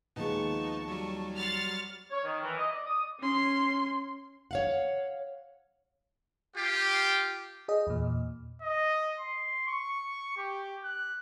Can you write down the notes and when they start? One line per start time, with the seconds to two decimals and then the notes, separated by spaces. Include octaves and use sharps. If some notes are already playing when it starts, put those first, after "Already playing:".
0.16 D#2 F3 G#3 B3 D#4 A5 C#6
0.88 F#3 G3
1.36 F#5 C6 F6 A6
2.11 C#5
2.24 D#3
2.41 E3
2.57 D#5
2.71 D5
2.87 D#6
3.20 C#4 C6
4.51 C#5 F5 F#5
6.56 F4 G4
7.68 G#4 D#5
7.87 E2 A#2
8.62 D#5
9.20 C6
9.68 C#6
10.37 G4
10.84 F#6